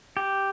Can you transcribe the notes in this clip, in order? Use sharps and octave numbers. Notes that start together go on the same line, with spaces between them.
G4